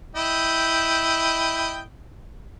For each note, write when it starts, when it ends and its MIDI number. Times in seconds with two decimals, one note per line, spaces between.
0.16 1.81 64
0.16 1.81 75
0.16 1.81 79